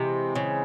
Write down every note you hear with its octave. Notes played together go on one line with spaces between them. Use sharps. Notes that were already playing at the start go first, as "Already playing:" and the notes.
Already playing: C3 E3 G#3 C4
C#3